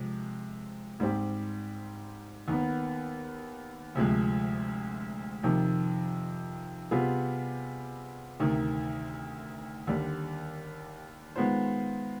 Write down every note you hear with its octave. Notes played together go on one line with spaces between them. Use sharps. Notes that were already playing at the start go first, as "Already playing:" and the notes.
Already playing: C3 F3 G#3
G#2 G3 C4 G4
D#2 D#3 B3
D2 C3 F3 G#3
F2 C3 D#3
C3 G3 B3 F4 G#4
D2 C3 D#3
D#2 D3 G3
D#3 G#3 B3 F4 C5